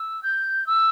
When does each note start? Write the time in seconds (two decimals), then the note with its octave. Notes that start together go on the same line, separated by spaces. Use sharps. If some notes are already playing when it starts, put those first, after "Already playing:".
Already playing: E6
0.23 G6
0.67 E6